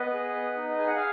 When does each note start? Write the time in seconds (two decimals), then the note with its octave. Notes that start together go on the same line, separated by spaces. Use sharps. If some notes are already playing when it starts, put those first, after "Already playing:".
Already playing: B3 B4 D#5
0.13 G#4
0.35 B3
0.56 D#4
0.78 G#4 G#5
0.87 F#5
0.96 F5 G#5